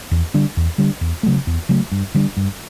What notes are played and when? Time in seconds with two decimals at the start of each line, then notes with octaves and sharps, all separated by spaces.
0.11 E2
0.34 D3 G3 D4
0.57 E2
0.78 D3 G3 D4
1.01 E2
1.23 C#3 F#3 A3
1.47 E2
1.69 C#3 F#3 A3
1.92 G2
2.14 D3 G3 D4
2.37 G2